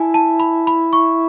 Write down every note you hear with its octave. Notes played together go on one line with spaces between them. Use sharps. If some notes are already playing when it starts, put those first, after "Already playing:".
Already playing: E4 G#5 A5
A5
B5
B5
C#6